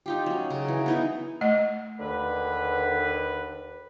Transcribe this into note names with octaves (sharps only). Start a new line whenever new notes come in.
D#4 F4 G4
F#3 C#4
C#3 A#4
E3
B3 D#4 E4
A3 D#5
D#2 D3 B4